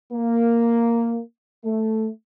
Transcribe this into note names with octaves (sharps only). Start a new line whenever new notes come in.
A#3
A3